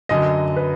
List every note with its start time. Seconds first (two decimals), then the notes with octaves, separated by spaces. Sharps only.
0.09 F#2 D3 F#3 D#5
0.57 B4